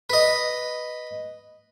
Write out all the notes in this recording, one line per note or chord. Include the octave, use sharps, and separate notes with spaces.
B4 D#5